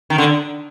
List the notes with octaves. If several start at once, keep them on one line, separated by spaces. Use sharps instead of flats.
D#3
D3